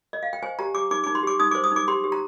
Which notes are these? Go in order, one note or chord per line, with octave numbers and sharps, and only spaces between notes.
D#5
F5
G5
C5 G#5
G4 A#5
G4 D6
D#4 D6
D#4 D6
C6
G4 D6
D#4 D#6
C5 D6
D#6
D#4 D6
G4 C6
G4
A#5